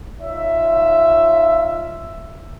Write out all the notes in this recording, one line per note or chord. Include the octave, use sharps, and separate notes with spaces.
D#4 F4 C#5 E5